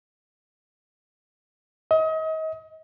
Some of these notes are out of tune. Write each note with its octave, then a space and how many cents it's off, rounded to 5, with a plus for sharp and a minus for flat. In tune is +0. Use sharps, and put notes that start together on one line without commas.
D#5 +35